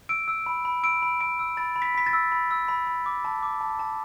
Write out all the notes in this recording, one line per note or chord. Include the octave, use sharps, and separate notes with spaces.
E6 D7
E6
B5
B5
E6 D7
B5
B5 D7
E6
B5 A6
B5
B6
B5 B6
A6
E6
B5
E6
B5
B5
D6
A5
D6
A5
A5